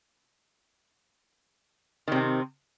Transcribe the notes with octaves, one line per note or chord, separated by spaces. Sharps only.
C3 D#3 C4